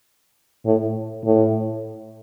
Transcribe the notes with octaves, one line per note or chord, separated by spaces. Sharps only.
A2
A2